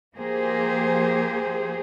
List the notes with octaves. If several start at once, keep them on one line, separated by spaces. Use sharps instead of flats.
F3 A#3 G4 G#4 C5